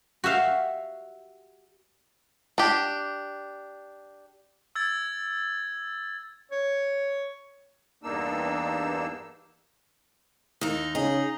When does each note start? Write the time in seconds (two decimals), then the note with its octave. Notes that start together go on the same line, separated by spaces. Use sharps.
0.24 F#4 G4 E5 F5
2.58 D4 G4
4.75 E6 G#6 A6
6.52 C#5
8.03 E2 G2 A#3 D4 D#4 E6
10.61 D#2 D#4
10.95 C#3 D#4 G#4